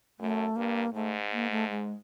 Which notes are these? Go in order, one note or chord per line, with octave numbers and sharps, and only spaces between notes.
F#2 A3
G2 A#3
G#2 A3
A#3
A3
G#3